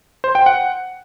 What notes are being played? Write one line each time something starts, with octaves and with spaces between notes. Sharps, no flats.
C5
G5
F#5